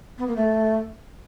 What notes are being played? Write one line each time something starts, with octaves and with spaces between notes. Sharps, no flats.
B3
A#3
A3